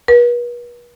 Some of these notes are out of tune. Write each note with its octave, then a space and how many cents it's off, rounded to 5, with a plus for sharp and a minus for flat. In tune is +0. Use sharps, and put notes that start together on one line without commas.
B4 -40